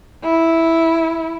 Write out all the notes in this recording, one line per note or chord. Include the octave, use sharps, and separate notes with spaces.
E4